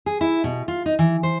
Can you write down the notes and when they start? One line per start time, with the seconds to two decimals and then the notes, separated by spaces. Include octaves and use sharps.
0.06 G#4
0.21 E4
0.44 B2
0.68 F4
0.86 D#4
0.99 E3
1.23 C5